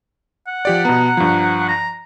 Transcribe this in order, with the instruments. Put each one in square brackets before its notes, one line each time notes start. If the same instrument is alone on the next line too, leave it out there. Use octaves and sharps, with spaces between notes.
[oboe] F#5
[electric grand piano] F3 G4 D5
[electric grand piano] B2 B3 [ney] A#5
[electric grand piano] G2 F3
[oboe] A#5